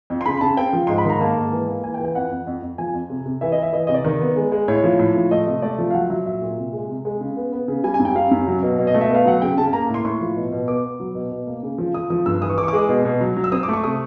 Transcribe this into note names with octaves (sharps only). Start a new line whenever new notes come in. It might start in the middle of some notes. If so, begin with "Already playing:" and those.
F2
C6
C#3 B5
C#3 A5
C4 G5
F3
G#2 C6
B5
D#3 A#5
A#3 A5
G#2
E3
A#3
E3 G#5
G5
E3
G5
F2 F#5
F2
F2
F2
F3 G#5
F2
C3
C3
E3 E5
D#5
E3 E5
E3 D#5
C3 D#5
D5
D#3
B3
G#3
G#3
A2 C#5
F3
A2
F3
A3 D#5
C3 D#5
A3 D5
F3
F5
F#3 F#5
F#3 E5
A#2 E5
A#2
C3
G#3
C3
G#3
C#3
B3
B3
C#3
G3 G#5
G#5
F#2
G5
G3 F5
F#2
F#3
B2
B2
D#5
A3
E5
B3 F5
F#3 F#5
C#3 G5
C#3 A5
A5
A#3 A#5
A2
C6
A2 C#6
F3
B2
B2
B3 D6
B3
F#3
B2
B2
A#3
C#3
F3
F3 D#6
F3 D#6
G2 E6
E3 D#6
C#6
E3 D6
C#6
D6
G#3
D#6
B2
B2
F#3
F#3
E6
C4 D#6
D6
A3
C#6
C3 D#6